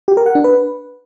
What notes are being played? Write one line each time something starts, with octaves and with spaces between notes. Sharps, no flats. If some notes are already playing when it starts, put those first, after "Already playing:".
G4
A#4
F#5
D4
B4